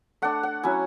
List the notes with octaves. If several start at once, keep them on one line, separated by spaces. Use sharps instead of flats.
A3 D4 F#5
F#5
F#3 C#4 E4 G#5